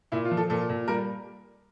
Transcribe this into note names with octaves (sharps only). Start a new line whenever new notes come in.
A#2 E4
F4
F3
A4
A#2 A4
A#2
G3 A#4